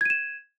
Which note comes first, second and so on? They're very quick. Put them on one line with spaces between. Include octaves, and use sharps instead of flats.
G#6 D#7 E7